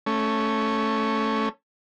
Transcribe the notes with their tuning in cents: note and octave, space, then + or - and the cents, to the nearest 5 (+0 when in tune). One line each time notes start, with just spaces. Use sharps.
A3 +0 C#4 +0